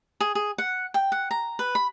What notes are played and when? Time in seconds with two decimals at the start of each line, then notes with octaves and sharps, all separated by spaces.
0.20 G#4
0.35 G#4
0.58 F#5
0.94 G5
1.12 F#5
1.31 A#5
1.59 B4
1.75 B5